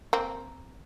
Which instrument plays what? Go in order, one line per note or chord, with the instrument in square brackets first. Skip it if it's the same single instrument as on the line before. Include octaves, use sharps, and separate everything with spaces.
[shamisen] A#3 C4